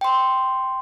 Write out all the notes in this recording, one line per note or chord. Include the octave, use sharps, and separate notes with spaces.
G5 C6